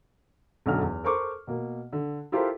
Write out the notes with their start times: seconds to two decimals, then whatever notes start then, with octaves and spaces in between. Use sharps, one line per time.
0.66 B1 F#2 D3 F#4 F6
0.81 E2
1.04 A4 A#4 C5 C#6 D6
1.47 B2 A#3
1.93 D3
2.32 E4 F4 G4 A4 A#4 C5